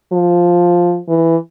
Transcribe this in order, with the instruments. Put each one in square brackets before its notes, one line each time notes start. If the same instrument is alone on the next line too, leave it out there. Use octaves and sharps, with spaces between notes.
[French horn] F3
E3